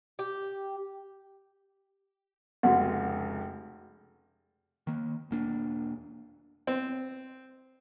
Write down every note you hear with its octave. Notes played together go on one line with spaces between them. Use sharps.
G4
F1 C#2 F#4 F#5
D#3 A#3
E1 A#3 D4
C4